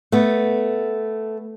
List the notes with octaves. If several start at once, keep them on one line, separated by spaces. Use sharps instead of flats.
A3 B3